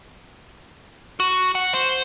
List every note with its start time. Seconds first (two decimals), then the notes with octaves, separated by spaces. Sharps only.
1.20 F#4
1.55 F#5
1.74 C5